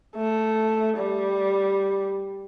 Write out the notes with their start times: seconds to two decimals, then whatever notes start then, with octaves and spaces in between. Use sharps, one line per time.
0.16 A3
0.97 G3